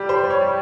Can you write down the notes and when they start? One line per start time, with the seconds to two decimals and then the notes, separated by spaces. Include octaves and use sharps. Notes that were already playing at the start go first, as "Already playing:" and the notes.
Already playing: G3 G4
0.09 C5
0.30 C#5